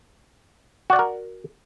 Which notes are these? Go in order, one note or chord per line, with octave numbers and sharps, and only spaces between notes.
F#4 A#4 D5 F#5